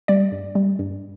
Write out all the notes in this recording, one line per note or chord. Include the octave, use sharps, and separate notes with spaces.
G3 D5
G2
G3
G2